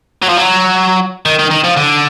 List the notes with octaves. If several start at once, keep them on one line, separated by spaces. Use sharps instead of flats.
F#3
F3
F#3
D#3
D#3
D#3
F3
D3